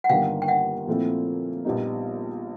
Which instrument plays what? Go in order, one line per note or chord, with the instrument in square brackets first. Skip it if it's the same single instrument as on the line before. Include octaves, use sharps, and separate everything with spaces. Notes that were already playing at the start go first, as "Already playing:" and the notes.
[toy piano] F#5
[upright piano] G1 G2 D#3 G3 A#3 [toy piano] F5 G5
[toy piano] G5
E5 F#5
[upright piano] A#2 F3 A3 C4 E4
A#1 A#2 G3 B3 D#4